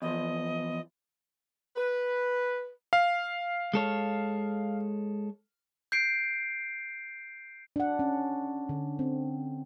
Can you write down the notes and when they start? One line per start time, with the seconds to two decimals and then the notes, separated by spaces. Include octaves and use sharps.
0.02 E2 F3 D#5
1.76 B4
2.93 F5
3.74 G#3 A4 C#5
5.92 G6 C7 D7
7.76 D4 F#5
7.99 C#4
8.69 D3
8.99 C4